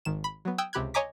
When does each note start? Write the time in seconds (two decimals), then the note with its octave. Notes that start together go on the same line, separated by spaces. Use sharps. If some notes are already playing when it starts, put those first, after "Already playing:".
0.05 G#1 D#3 E7
0.24 B5
0.45 F#3 B3
0.58 G5 D#6 E6 F#6 G#6
0.73 C#2 C3 G4 B5 F#6 G#6
0.94 C#5 D#5 G#5 A#5 D6 B6